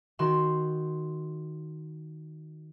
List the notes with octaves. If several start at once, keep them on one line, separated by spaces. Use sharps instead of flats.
D#3 F#4 C6 E7